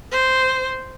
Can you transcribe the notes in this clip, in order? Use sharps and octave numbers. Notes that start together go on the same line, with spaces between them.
C5